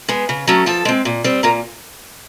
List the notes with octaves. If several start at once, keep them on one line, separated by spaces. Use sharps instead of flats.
G#3 B3
C#3
F#3 A3 C#4
F3 A4 A5
G#3 C4
A#2
G3 C4
A#2 A#4 A#5